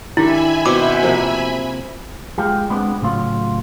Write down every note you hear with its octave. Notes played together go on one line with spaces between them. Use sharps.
D3 D#3 E4 G4 E5 G#5 B5
B2 C4 D6
C3 F3 A#3
G#3 F4 G4
G#3 B3 C4 D4
A2 C#3 F#3 F4